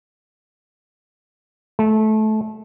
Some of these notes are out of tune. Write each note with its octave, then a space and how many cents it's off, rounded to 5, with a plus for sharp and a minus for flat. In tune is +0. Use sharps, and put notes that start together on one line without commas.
A3 -20